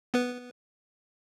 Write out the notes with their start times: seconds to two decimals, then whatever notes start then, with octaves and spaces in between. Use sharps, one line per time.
0.14 B3 B4